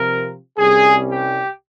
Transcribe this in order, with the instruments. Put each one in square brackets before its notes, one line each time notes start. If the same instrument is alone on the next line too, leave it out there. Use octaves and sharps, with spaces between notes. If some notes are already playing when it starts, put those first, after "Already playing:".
Already playing: [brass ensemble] C3 F3 C4 A#4
C2 C3 G3 C#4 G#4
G4